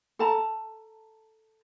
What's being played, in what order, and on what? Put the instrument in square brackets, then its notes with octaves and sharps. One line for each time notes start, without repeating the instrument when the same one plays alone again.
[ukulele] A4 A5 A#5